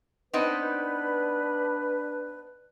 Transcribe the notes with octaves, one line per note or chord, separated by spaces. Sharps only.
B3 C4 D4 D#4 B4